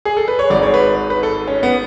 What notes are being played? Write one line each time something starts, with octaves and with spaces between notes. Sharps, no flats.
G#4
A4
B4
C#5
G#1 G#2 D5
C#5
B4
B4
A4
C#4
B3